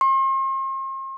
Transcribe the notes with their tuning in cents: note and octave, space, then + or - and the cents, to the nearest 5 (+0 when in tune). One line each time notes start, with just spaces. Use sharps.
C6 +45